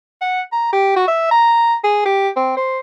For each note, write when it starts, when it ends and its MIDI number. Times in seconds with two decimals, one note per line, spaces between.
0.21 0.40 78
0.52 0.71 82
0.72 0.95 67
0.96 1.07 66
1.08 1.28 76
1.31 1.75 82
1.84 2.03 68
2.05 2.29 67
2.36 2.55 60
2.57 2.79 72